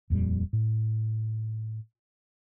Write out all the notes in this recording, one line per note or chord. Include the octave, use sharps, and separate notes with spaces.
D#1 F2 A#2 G3
A2